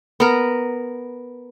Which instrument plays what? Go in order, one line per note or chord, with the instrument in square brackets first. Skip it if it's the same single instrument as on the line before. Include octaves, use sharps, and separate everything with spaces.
[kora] B3 A#4